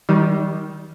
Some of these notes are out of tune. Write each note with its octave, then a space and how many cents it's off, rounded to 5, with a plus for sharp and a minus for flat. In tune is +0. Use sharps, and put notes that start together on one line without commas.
D#3 +20 G3 -20